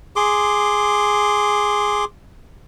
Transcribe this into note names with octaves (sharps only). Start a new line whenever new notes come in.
G#4 C6 D6